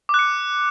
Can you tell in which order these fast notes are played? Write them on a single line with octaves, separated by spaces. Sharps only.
D6 F#6 C#7